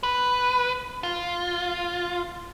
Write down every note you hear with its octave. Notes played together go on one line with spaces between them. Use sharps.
B4
F4